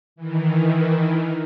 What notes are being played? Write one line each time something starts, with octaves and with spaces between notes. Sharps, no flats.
D#3 E3